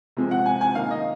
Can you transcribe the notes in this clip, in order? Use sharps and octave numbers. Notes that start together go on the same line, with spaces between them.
C3 F3 G#3
F#5
G#5
G#5
D#3 A#3 D#4 F5
D#5